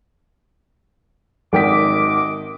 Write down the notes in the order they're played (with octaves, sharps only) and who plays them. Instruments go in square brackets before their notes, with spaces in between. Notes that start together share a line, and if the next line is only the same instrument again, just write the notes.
[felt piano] G#1 G5 B6 [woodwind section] F#2 D#5 D6